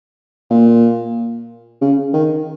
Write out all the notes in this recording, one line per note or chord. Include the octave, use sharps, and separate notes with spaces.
A#2
C#3
D#3